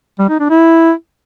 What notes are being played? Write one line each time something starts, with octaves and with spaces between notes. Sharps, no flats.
G3
D#4
D4
E4